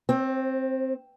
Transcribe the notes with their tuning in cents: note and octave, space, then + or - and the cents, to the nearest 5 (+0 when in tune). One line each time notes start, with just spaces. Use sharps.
C4 +5 C5 +40